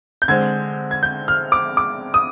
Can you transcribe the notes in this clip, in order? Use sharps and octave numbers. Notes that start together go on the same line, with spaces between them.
G6
D3 G#3 C4 G#6
G#6
G6
F6
D6
D6
D#6